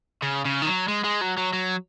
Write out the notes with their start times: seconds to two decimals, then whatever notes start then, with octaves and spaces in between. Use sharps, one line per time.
0.22 C#3
0.45 C#3
0.62 D#3
0.67 F#3
0.88 G#3
1.04 G#3
1.21 F#3
1.37 F#3
1.53 F#3